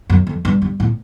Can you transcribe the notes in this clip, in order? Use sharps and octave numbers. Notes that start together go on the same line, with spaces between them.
F#2
F2
G2
G2
A2